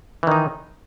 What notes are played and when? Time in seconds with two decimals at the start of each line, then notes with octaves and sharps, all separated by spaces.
0.23 E3
0.27 D#3
0.31 D#4